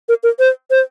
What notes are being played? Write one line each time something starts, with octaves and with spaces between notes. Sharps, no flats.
A#4
A#4
C5
C5